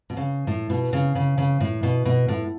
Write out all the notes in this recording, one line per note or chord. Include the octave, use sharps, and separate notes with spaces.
B2
C#3
A2
B2
C#3
C#3
C#3
A2
B2
B2
A2